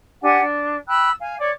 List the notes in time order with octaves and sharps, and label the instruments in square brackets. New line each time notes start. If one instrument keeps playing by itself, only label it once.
[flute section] D4 G4 F#5 G#5
D4
G5 B5 E6 F#6
F5 G#5
C#5 D5 D6